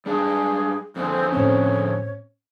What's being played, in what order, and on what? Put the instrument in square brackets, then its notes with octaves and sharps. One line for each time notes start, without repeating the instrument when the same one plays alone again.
[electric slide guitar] G3 D4 F5 [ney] G#4
[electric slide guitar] F2 D3 G#4 [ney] C4
[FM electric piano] A2 C4 C#4 [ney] C#5